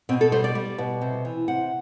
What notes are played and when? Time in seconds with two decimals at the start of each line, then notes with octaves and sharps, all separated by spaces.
0.09 B2 C4
0.21 A4
0.32 G3 C5
0.44 D5
0.55 G3
0.78 B2
1.01 C3
1.25 E3
1.48 C3 F#5